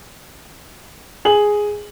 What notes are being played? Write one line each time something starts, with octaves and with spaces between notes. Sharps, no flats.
G#4 F#7